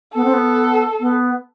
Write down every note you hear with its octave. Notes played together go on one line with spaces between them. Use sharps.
B3 A4
C4
B3
B3